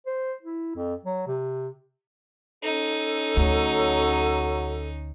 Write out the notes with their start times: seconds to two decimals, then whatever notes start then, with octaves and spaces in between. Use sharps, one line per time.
0.06 C5
0.42 E4
0.76 F2
1.05 F#3
1.27 C3
2.63 C#4 D#4 A4
3.37 D2 F#3